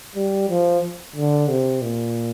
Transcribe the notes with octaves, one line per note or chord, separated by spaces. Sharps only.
G3
F3
D3
C3
A#2